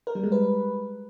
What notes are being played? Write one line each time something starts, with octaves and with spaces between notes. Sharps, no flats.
A#4
G3
G#3
B4